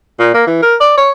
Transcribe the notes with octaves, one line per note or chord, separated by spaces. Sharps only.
A#2
A#3
E3
A#4
D5
C#5